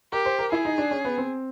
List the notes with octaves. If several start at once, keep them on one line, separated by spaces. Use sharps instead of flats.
G4 A#4
C5
A#4
E4 G#4
D#4
D4
C#4
B3
C4